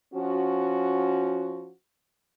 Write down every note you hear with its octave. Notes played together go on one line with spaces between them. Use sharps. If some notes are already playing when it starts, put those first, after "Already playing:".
F3 C#4 F#4